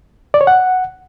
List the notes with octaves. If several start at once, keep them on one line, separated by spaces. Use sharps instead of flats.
D5
C#5
F#5